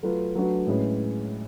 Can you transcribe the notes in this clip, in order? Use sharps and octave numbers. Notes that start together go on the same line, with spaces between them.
F#3 A3 F4 B4
F#3 A3 D4 F#4 B4
A2 G#3 C#4 G#4 B4